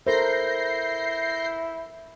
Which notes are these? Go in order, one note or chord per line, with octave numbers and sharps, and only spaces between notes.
E4 A4 A#4 C5 G6 A#6 C7